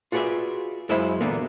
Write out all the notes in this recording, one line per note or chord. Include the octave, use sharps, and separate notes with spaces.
F4 F#4 G#4 B4 D5 E5
F#2 G#3 E4 C5 F5 B5
E2 A#2 D3 A#3 B3